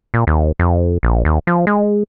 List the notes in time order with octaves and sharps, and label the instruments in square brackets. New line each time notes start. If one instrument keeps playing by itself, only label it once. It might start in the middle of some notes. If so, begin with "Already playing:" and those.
[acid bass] A#2
D#2
F2
A#1
D#2
F3
G#3